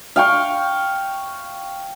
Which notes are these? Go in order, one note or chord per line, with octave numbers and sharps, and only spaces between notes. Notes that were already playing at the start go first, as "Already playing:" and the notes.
F5 G5 C#6